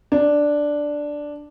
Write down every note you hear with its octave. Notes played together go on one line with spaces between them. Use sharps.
D4